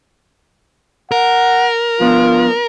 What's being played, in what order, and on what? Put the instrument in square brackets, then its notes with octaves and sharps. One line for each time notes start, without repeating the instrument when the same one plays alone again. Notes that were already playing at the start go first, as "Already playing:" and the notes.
[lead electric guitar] A#4 [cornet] F#5
[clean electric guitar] F3 B3 D4 [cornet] F4